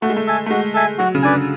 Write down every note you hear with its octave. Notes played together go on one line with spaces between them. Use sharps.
A3 F#4
G#3
A3
A4 E5 G#5
A3
G#3 F#4
A4 E5 G#5
F#3 F#4
C#3
D3 B4 D5 G#5